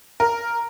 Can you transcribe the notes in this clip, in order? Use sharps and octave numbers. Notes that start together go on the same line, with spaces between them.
A#4